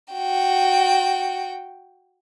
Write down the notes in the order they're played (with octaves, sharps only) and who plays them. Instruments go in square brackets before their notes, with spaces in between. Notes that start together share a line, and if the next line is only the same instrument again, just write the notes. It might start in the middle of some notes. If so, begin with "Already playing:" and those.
[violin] F#4 G5